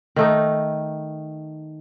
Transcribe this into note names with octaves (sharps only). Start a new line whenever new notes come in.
D#3 A3 D#4